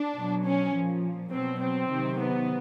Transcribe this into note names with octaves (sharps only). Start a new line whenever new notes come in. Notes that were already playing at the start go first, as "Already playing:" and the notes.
Already playing: D4
B2 F#3
C#4
A#2 F3
B2 F#3 C4
C4
C3 D#3 F#3
B3